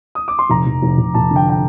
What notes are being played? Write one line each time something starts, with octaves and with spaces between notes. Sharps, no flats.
D#6
D6
C6
F1 A#5
F1
F1
F1
F1 A5
D3
G5
G5